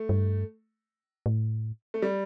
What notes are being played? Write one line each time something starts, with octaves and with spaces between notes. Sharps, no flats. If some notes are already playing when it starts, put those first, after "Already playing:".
Already playing: A3
G2
A2
A3
G3